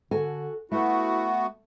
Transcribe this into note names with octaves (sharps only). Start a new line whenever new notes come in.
D3 F#4 A4 G#5
A3 B3 E4 F#4